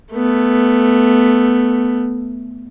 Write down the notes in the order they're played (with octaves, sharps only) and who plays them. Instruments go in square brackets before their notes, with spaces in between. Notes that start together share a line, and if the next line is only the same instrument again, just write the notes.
[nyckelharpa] A3 B3